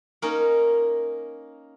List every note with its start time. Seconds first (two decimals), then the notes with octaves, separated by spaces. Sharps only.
0.22 A#3 C#4 D#4 A#4